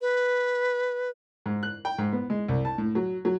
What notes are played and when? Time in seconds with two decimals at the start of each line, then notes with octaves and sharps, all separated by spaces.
0.01 B4
1.46 G#2
1.63 F#6
1.85 G5
1.98 G#2
2.12 B3
2.30 G#3
2.49 C2
2.65 A5
2.78 A2
2.95 F#3
3.25 F#3